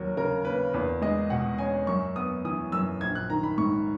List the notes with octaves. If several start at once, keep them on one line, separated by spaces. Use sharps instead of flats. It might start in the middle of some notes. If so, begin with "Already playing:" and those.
Already playing: D#2 F#3 A#4
C#3 A#4
A#3 B4
E2 B4
G#3 D#5
B2 F#5
C#4 G#5
F#2 C#6
B3 D#6
E3 D#6
F#2 E6
A#1 G#6
F#6
D#3 A#5
B5
G#2 C#6